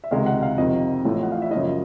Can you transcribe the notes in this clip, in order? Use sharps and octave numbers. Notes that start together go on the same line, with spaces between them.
E5
C#2 C3 D#3 G#3 F5
F#5
F5
F2 C3 D#3 D#5
A1 A2 F3 A3
F#5
F5
E5
F#2 C#3 F3 D#5